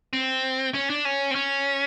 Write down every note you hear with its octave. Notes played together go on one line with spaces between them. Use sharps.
C4
C#4
D4
C#4
C4
C#4